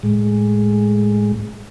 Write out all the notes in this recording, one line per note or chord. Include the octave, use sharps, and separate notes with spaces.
A2 G#3